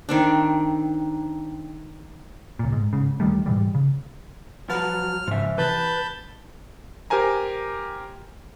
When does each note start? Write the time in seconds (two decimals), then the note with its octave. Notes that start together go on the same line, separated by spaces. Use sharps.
0.09 D#3 C4 D4
2.59 C#2 A#2
2.72 G#2
2.93 G#2 C#3
3.20 D2 D#3 G3 A3
3.46 G#2 B2 E3 G3
3.74 C#3
4.69 F3 F#3 B4 F#5 A5 F6
5.27 G#2 C#3 F3 E5
5.58 C3 E3 B4 A5 B5 G6
7.10 G4 A#4 C5 G#5 A#5